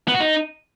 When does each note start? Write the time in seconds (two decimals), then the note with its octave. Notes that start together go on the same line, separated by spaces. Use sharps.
0.08 B3
0.14 F#4
0.20 D#4